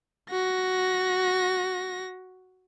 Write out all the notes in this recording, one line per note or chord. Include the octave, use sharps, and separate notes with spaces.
F#4 A#6